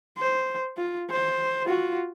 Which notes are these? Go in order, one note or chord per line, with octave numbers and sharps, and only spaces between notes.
C5
F4
C5
F4 F#4